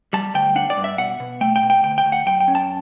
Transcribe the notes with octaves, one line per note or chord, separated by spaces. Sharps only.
G3 A5
D2 G5
D4 F#5
D5
G2
E5
B2 F#5
B2
A3 G5
G5
B2
G5
D2 G5
G5
D2
F#5
F#2 G5
G5
C#4
A5